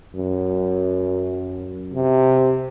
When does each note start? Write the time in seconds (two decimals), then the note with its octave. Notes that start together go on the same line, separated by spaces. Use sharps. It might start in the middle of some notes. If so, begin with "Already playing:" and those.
0.15 F#2
1.93 C3